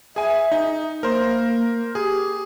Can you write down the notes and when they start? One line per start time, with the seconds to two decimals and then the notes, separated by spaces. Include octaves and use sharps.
0.16 G#4 E5 G#5
0.52 D#4
1.03 A#3 A#4 C5
1.95 G4 G#4